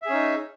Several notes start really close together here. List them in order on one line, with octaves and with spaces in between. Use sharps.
E5 G#4 C#4 D#4